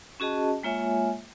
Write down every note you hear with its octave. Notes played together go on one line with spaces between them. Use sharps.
C#4 F#4 G#4 D#5 A5
G#3 A#3 F4 C#5 E5 G#5